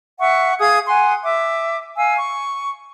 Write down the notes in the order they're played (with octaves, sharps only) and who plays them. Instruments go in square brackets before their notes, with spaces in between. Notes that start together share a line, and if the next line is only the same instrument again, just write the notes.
[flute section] E5 F#5 C#6
G#4 F5 D#6 G#6
F#5 G#5 C6
E5 D6
F5 G#5 E6
C#6